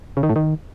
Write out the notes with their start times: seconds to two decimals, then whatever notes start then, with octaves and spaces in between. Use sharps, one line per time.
0.17 C#3
0.23 D#3
0.29 A2
0.36 D#3